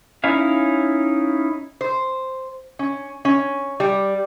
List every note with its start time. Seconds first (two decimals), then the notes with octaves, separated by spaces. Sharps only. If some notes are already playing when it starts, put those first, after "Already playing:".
0.24 C#4 D#4 E4 F5
1.81 C5
2.79 C#4
3.25 C#4
3.80 G3